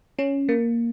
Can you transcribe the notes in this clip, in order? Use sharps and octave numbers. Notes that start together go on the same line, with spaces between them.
C#4
A#3